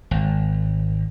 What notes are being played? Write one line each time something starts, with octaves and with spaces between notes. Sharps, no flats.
G#1